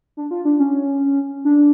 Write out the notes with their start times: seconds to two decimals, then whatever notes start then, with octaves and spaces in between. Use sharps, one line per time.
0.17 D4
0.31 F4
0.45 D4
0.59 C#4
1.45 D4